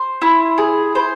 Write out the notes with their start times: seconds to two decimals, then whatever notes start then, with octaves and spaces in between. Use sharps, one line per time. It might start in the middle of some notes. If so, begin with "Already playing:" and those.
Already playing: C5
0.22 E4
0.58 G#4
0.95 C5